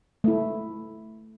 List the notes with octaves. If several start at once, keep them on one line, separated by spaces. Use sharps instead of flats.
A3 E4